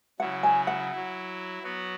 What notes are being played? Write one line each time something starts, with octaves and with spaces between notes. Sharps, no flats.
C#3 F#3 E4 F#5
G#5
F#5
F#3 E4
F#3 B3 F#4